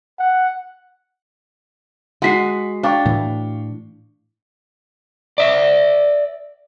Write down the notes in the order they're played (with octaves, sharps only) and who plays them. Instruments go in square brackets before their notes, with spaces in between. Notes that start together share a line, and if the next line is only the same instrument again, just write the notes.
[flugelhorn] F#5
[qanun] G#3 F#4 [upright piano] F#5 B6 C7
[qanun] D4 [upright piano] F5 G5 C#6
[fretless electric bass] A2 E3
[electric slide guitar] D5 E5